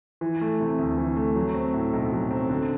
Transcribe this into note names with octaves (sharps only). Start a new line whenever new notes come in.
E3
A3
C3
D2
E3
A3
F#3
C4
A2
B1
F#3
C4
D3